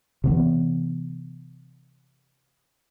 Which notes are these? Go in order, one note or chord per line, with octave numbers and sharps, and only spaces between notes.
C3 E3 B3